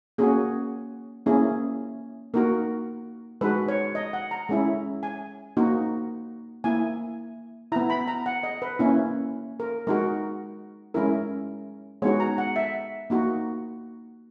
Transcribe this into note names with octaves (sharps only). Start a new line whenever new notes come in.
A#3 C#4 F#4 G#4
A#3 C#4 E4 G#4
A#3 D#4 F#4 A#4
G#3 D#4 F#4 B4
C#5
D#5
F#5
A#5
G#3 C#4 E4
G#5
A#3 D#4 F#4
A#3 E4 G#5
B3 E4 A#5
B5
A#5
F#5
D#5
B4
A#3 C#4 E4
A#4
G#3 D#4 F#4 A#4
G#3 C#4 E4 A#4
G#3 B3 D#4 F#4 C#5
A#5
F#5
E5
A#3 D#4 F#4